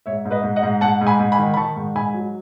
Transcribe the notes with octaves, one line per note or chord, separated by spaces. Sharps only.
G#2 C#5 E5
G#2
B4 D#5
G#2
D#5 F#5
G#2
G#2 F#5 A5
G#2
G#5 B5
G#2
G#5 B5
D#3
B5
D#3 A5 C#6
G#2
G#2 G#5 B5
F#3